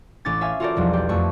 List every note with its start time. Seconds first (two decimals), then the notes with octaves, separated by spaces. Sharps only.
0.25 A1 C#4 D6 A6
0.41 E5 F5 G#5
0.60 F4 F#4 A4 A#4 C5 D5
0.76 B1 E2 F3 G3
0.93 G4 D5
1.09 F2 A3 C#6